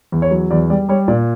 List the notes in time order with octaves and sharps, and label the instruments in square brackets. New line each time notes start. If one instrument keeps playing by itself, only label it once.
[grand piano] E2
C#5
F#3
E2 D5
G3 D5
G3 C#5
A#2 D5